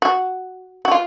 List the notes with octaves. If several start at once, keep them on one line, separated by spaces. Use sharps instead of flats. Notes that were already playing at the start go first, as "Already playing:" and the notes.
F#4
F#4
F4